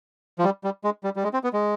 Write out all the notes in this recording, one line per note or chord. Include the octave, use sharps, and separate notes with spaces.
F3
G3
G3
G#3
G3
G3
G#3
C4
B3
G#3